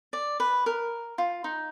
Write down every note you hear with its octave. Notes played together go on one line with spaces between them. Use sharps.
D5
B4
A#4
F4
D#4